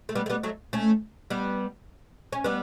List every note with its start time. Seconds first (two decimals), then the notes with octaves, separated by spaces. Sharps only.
0.09 A3
0.15 G3 B3
0.26 A3
0.30 G3 B3
0.43 F#3 A3
0.73 A3 C#4
1.30 G3 B3
2.32 C#4
2.44 G3 B3